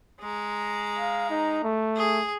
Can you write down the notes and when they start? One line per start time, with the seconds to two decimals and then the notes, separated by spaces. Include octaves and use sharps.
0.20 G#3 A#5
0.99 F5
1.30 D#4
1.64 A3
1.96 G#4